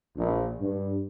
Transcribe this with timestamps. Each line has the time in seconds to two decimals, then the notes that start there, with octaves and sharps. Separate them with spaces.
0.17 A#1
0.61 G2